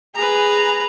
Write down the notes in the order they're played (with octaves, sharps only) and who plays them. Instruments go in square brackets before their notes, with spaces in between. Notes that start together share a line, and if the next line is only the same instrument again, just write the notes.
[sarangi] G#4 [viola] B4 A#5